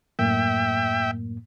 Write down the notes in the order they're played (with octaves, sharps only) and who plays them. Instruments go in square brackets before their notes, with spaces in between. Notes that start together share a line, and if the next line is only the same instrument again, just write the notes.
[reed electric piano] F#2 A2 A#3 [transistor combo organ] E5 G5